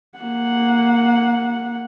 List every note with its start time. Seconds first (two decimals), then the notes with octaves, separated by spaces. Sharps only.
0.19 A#3 F#5